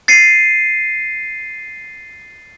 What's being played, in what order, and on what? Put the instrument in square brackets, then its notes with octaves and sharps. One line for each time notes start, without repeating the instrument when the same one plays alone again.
[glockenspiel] A6 C7 C#7 D#7